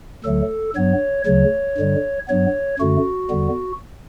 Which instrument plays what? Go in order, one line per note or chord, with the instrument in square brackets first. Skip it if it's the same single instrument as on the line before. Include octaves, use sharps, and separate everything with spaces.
[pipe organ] D2 D3 F#3 A3 A4
G2 F#3 B3 C#5
D2 C#3 F#3 C#5
G2 D3 G3
G2 F#3 B3 C#5
F#2 D3 A3 F#4
E2 D3 G3 B3